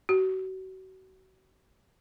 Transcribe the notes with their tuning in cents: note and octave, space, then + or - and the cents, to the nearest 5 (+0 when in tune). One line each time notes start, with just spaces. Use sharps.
F#4 +35